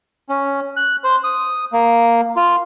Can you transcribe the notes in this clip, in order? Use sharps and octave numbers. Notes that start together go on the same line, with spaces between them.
C#4
F#6
C5
D#6
A#3
F4